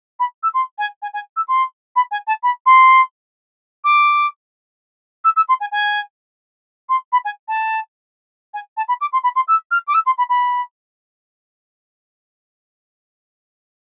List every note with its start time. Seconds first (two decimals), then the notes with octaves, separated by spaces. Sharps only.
0.20 B5
0.43 E6
0.54 C6
0.78 G#5
1.02 G#5
1.14 G#5
1.36 E6
1.48 C6
1.96 B5
2.11 G#5
2.27 A5
2.43 B5
2.66 C6
3.84 D6
5.24 E6
5.36 E6
5.49 C6
5.61 G#5
5.72 G#5
6.89 C6
7.12 B5
7.25 G#5
7.48 A5
8.54 G#5
8.77 A5
8.88 B5
9.01 D6
9.13 C6
9.24 B5
9.36 C6
9.48 E6
9.71 F6
9.88 D6
9.94 E6
10.06 C6
10.18 B5
10.29 B5